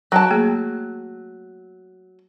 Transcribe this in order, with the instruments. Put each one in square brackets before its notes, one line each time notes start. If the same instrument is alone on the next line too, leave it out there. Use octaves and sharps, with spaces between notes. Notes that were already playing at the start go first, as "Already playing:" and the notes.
[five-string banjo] F#3 G5 A5
[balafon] A3 A#3 G#4